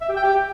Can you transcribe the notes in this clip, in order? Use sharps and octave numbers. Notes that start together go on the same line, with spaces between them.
E5
G4
G5
G4